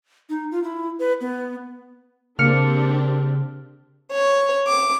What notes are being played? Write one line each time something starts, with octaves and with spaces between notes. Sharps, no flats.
D#4
F4
E4
B4
B3
C#3 A#3 C4 D4 G4 F6 C#7
C#5
D6